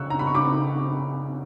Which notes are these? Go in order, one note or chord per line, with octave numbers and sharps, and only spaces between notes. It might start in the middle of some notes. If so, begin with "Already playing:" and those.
Already playing: C#3 C#6 E6 F#6
A#5
B5
C#6
C#3 B5 D6